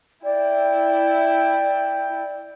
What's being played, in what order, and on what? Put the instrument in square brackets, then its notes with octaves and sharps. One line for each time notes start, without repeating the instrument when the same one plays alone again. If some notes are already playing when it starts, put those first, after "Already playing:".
[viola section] E4 [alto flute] D5 [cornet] G5